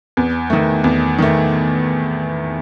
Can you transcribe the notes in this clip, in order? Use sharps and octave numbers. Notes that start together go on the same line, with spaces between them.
E2
D#3 A3
E2
D#3 A3